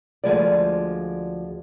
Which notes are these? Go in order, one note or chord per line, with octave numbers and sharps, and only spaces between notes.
D2 F3 G#3 D5